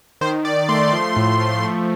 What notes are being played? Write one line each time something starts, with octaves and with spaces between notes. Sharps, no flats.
D#3 C5
D#3 D5
A3 C6
F3
A2
F3
A3